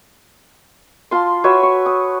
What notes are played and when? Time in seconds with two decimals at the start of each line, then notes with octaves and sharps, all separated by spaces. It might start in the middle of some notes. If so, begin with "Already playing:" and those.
1.11 F4 A5 C6
1.44 F#4 B4 C#5 E5
1.63 C#6
1.86 D#6